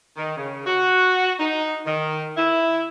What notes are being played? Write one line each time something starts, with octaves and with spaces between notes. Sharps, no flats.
D#3
C#3
F#4
D#4
D#3
E4